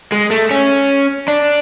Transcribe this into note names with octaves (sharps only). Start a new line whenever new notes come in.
G#3
A3
C#4
D4